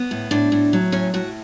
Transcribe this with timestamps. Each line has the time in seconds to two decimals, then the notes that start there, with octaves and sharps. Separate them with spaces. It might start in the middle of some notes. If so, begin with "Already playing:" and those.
Already playing: B3
0.11 A2
0.31 A2 D4
0.52 A2
0.73 F#3
0.92 A2 C#4
1.14 A2 F#4